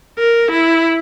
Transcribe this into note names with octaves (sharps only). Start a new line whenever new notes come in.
A#4
E4